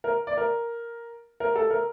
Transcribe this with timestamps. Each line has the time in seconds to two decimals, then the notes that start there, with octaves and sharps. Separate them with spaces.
0.04 A#4
0.27 D5
0.37 A#4
1.40 A#4
1.55 A4
1.70 A#4